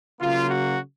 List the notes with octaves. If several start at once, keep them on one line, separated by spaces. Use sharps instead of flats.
C#3 F#3 A#3 F4
F#4